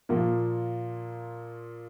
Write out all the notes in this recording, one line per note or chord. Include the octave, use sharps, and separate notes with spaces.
A#2 F3 A#3